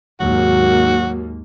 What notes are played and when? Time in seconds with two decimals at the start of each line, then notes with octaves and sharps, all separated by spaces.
0.20 D#2 G#2 F#3 A#3 F#4